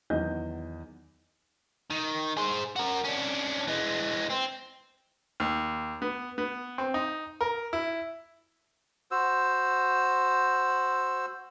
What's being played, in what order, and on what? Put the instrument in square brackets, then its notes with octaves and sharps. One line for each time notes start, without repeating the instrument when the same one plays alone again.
[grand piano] E2 D#3 F#3 D#5 G6
[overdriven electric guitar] D#3
G#4 C5
F#4 A#4
C#4 D4
E3 G#3
C4
[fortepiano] D#2
B3
B3
C4
D#4
A#4
E4
[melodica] F#4 C5 E6